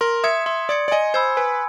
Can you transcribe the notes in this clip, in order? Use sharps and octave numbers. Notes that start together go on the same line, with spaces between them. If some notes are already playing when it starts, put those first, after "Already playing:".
A#4 C6
E5 D#6 G#6 C#7
E5 C6
D5 D#6 G#6 C#7
D5
D#5 G#5
C5 B5 E6 G#6
B4 G#5